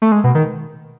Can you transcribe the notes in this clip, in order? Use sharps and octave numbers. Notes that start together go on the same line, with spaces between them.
A3
G#3
B2
D#3